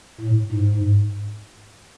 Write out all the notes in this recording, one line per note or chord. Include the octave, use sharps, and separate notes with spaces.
A2
G#2